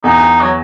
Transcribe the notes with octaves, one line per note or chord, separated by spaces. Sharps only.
E2 D#4
F#3